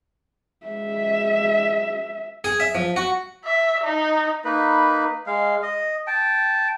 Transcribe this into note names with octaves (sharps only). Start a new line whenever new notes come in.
G#3 E5
G#4
E5
F3
F#4
E5
D#4
A#3 D#4 B4 B5
G#3 F5
D#5
G5 A5